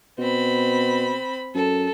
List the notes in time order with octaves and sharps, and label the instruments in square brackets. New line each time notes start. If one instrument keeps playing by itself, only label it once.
[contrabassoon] B2 [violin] C4 B5
[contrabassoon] F#2 [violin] A4